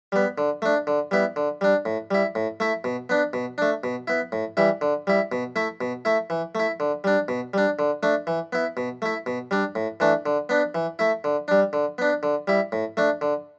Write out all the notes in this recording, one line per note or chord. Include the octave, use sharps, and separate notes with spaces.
G3 B3
D3
A3 D4
D3
G3 B3 E4
D3
G3 D4
A2
G3 E4
A2
A3 E4
B2
B3 D4
B2
A3 D4
B2
B3 E4
A2
E3 G3 E4
D3
G3 E4
B2
A3 E4
B2
A3 E4
E3
A3 E4
D3
G3 D4
B2
G3 D4
D3
A3 D4
E3
B3 E4
B2
A3 E4
B2
G3 D4
A2
E3 A3 D4
D3
B3 D4
E3
A3 E4
D3
G3 D4
D3
B3 D4
D3
G3 E4
A2
A3 D4
D3